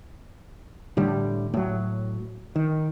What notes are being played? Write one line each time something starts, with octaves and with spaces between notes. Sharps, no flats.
A2 D3 G3
A2 F#3
D#3